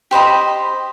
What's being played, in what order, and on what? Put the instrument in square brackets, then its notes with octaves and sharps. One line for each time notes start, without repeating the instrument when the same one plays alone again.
[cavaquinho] G4 C5 D#5 B5